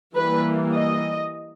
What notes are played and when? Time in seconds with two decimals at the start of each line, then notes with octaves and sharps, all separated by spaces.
0.16 E3 G3 A#3 B4
0.76 D#5